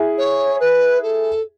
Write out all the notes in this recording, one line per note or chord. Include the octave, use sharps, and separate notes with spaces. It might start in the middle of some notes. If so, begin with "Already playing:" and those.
Already playing: E4 G#4
C#5
B4
A4